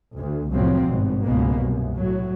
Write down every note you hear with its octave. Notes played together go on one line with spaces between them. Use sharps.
D2
C2 F2 A2 F3 F#3 C4
G#1 G2 B2
C#2 G#2 B2 A#3 B3
C2 F#2
A2 F#3